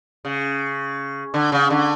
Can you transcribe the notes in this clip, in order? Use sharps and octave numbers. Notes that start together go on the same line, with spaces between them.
C#3
D3
C#3
D3